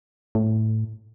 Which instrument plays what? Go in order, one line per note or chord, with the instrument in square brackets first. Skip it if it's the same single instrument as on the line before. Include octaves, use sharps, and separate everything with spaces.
[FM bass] A2